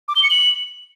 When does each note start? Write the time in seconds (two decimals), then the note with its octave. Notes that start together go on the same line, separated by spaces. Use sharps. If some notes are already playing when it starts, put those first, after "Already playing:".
0.08 D6
0.16 G7
0.23 C#7
0.30 F#7